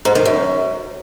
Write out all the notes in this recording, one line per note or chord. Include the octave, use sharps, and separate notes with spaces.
G#2
D#3
F#2